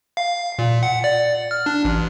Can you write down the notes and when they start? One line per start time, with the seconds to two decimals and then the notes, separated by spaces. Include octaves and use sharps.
0.17 F5
0.59 A#2
0.83 F#5
1.04 D5
1.51 F6
1.66 D4
1.85 A1